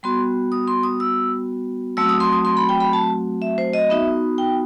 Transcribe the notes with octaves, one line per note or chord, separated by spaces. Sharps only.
G3 B3 F#4 C6
D#6
C6
D#6
E6
F#3 A3 C4 F#4 E6
D#6
C6
D#6
C6
B5
G5
B5
A5
E5
C5
D#5
B3 D#4 F#4 E5
G5